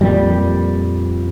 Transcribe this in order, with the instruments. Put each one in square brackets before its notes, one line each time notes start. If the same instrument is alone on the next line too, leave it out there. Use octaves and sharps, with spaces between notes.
[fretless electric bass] F2 A#2 G3